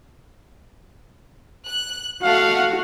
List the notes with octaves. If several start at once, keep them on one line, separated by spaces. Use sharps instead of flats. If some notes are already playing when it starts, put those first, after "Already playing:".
F#6
A3 F#4 F5 F#5